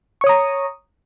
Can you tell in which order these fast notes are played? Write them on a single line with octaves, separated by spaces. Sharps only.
C#6 C#5 D#6 A#5